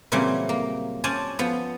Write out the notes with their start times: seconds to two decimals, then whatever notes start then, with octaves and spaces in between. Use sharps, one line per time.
0.12 A#2 C#3 E3 F#3 G3 C4
0.49 A#3
1.04 C#4 C5 D5 G#5 A5
1.39 F3 B3